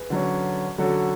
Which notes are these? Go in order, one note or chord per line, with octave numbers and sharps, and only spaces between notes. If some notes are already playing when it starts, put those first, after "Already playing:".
Already playing: G#4 B4
D3 F#3 C#4
D3 F#3 C#4 F#4 A4